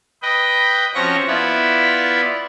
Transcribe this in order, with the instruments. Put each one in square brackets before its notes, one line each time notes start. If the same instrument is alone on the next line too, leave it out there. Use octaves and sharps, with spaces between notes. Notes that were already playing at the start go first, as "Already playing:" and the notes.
[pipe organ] B4 D#5 G5
F3 C4 C#4 F#4 C#6 A#6
B3 E4 F4 B4 D5 E5